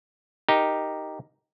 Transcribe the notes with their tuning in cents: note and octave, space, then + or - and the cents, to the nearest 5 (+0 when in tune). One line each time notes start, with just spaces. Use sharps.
D#4 +0 G4 +0 A#4 +0